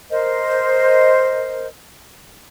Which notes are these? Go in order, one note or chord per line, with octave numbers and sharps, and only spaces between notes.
A#4 C5 D#5